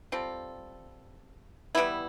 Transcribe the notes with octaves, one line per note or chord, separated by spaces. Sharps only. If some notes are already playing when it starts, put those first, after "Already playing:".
G3 C4 F4 A4
E3 G3 B3 E4